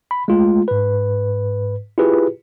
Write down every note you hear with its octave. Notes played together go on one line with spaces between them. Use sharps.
B5
G#3 A3 F4
G#2 B4
E4 F4 G4 G#4 B4